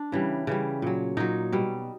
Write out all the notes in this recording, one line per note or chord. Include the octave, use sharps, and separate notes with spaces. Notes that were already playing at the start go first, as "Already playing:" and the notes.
Already playing: D4
C#3 E3 G3
C#3 E3 G3
A#2 F#3
A#2 F#3 D#4
B2 G3